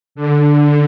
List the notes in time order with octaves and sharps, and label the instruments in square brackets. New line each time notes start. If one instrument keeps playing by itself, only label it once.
[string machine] D3